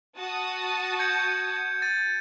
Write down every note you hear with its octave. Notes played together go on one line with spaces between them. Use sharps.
F#4 A5 D#6
G6 G#6 C#7
A6 D#7